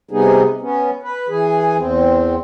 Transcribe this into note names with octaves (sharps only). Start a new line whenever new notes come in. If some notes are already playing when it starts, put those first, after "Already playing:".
C3 G3 B3 D#4 G#4
B3 C#4
B4
E3 G#4
E2 C4